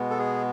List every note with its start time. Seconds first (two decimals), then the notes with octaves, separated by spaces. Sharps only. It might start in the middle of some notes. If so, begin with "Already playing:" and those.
Already playing: B2 G#3 B3
0.10 A4
0.19 G#4